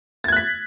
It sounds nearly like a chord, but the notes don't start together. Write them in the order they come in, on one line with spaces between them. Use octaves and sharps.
A6 G#6 F#6 B6